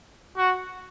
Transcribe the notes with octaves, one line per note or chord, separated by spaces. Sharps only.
F#4